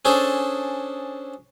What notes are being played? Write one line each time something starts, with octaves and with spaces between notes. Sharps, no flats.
C#4 D4 G#4 A4 C5